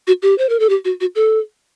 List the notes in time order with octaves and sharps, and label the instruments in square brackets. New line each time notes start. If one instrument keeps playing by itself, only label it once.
[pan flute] F#4
G4
C5
A#4
A4
G4
F#4
F#4
A4